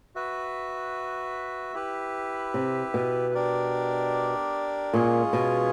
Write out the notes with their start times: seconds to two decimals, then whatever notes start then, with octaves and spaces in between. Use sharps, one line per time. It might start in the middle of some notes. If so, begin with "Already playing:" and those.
0.15 F#4 B4 E5
1.74 E4 G4 B4
2.54 C3
2.94 B2
3.34 D4 G4 A#4 D5
4.93 A#2 G#3 C#4 F4 G#4 C#5
5.33 B2